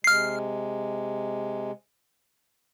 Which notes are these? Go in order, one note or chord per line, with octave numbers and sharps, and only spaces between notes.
C3 G#3 F6 C7